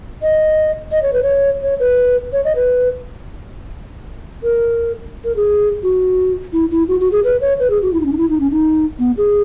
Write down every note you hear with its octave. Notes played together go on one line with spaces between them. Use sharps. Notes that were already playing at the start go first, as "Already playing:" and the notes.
D#5
D#5
C#5
B4
C#5
C#5
B4
C#5
D#5
B4
A#4
A#4
G#4
F#4
E4
E4
F#4
F#4
G#4
B4
C#5
B4
G#4
F#4
E4
D#4
C#4
D#4
E4
D#4
C#4
D#4
B3
G#4